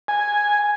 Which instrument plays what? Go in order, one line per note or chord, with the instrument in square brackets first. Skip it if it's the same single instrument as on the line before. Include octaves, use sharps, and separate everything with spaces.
[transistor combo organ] G#5